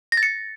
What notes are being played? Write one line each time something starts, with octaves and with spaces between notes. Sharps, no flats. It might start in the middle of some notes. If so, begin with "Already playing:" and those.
A#6
A6
C#7